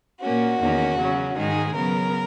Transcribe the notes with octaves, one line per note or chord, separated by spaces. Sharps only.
A#2 A#3 C#4 F#4
E2 D#3 A#3 C#4
C#3 F#3 C#4
G#2 D#3 G#3 G#4
C#3 F#3 B3 A#4